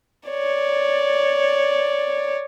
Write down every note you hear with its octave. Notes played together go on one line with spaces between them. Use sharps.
C#5 D5